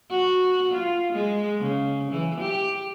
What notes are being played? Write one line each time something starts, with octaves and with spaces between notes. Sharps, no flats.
F#4
F4
G#3
C#3
E3
G4